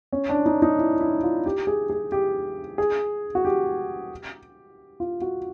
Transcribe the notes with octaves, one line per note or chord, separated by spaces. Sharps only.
C#4
D4
D#4
D#4
E4
E4
F4
G4
G#4
G#4
G4
G#4
F#4
G4
F4
F#4